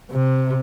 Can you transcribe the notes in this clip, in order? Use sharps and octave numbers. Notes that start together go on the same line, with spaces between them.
C3